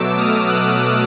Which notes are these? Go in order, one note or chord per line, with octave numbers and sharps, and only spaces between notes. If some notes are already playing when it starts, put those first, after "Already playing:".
Already playing: B2 F#3 A3 D6 E6
D#6 F6
E6 F#6